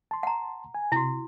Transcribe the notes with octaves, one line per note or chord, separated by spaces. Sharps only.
A5 C6
F#5 A#5
G#5
C3 E4 F#4